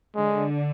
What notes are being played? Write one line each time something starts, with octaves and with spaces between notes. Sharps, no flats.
D3 G#3